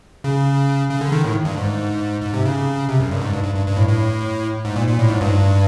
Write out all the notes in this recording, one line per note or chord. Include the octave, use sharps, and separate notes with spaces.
C#3
C#3
D3
D#3
A2
G2
G#2
G#2
C3
C#3
C3
F#2
G2
G#2
G2
G2
G2
G2
A2
A2
G#2
A#2
A#2
A2
G#2
G2